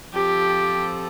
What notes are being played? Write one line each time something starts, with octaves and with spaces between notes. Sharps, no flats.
F3 C4 G4 A4